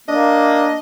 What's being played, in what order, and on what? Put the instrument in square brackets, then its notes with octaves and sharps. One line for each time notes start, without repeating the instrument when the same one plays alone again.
[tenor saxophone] A#3 [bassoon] D4 [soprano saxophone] D#5